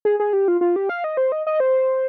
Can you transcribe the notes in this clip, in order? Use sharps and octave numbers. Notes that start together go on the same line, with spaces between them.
G#4
G#4
G4
F4
F4
G4
F5
D#5
C5
D#5
D#5
C5